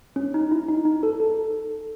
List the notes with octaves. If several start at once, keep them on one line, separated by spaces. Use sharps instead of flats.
C#4
D#4
E4
D#4
D#4
A4
A4